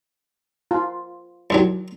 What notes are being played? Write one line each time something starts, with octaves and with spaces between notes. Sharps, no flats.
F4
C2 D#3 F#3